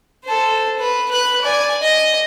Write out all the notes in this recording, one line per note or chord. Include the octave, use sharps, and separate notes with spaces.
A4 C5
B4
B4 F#6
D5 G#5
D#5